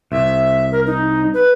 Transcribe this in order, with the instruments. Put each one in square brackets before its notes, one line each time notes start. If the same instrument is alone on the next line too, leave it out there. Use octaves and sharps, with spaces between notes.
[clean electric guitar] C2 [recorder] E5
[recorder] A#4
D#4
B4